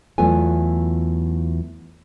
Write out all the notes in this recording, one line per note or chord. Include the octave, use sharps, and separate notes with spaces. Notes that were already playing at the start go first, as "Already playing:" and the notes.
E2 F#3 A3 B3 F4 G#5